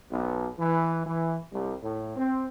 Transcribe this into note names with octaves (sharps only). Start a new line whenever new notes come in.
B1
E3
E3
C2
A2
C4